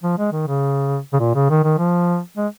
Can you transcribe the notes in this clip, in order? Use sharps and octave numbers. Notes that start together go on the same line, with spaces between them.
F3
G#3
D#3
C#3
C#3
A#2
C#3
D#3
D#3
F3
G#3